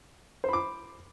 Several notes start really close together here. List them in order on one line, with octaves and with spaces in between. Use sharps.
C5 B5 D6